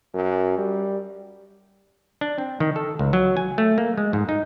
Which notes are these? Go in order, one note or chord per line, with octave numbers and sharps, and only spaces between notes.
F#2
G3
D4
C4
D#3
A4
C#2
F#3
G#5
A3
A#3
G#3
G#2
D#4